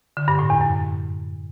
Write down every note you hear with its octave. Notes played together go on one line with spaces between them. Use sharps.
D3
G2
A2
E2
F#2